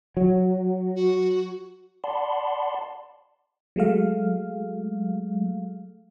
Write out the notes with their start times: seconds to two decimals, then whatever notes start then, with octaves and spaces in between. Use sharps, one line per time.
0.17 F#3
0.96 F#4
2.04 D5 F#5 A5 B5 C6
3.76 F#3 G#3 A3 F5